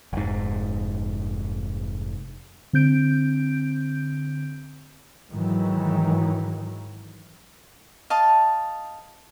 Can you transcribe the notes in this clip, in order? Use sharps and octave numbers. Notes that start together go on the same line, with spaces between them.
F1 G#2
D3 C4 G6 D7
G#2 D#3 E3 F#3
D#5 F5 A5